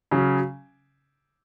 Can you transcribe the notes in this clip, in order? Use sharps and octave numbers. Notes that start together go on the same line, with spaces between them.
C#3 F#3 C#4